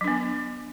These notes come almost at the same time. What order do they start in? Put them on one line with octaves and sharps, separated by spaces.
F#3 D4 B3